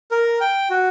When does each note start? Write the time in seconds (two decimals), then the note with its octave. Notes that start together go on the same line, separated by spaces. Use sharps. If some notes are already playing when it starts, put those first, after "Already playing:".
0.11 A#4
0.41 G5
0.70 F#4